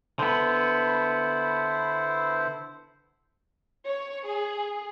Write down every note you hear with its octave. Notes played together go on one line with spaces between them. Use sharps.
D3 B3 E4 C5
C#5
G#4